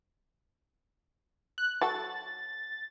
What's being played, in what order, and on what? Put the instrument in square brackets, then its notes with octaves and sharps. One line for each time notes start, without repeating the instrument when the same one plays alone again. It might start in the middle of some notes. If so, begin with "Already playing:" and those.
[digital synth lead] F#6
[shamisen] F#3 F#4 A4 [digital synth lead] A6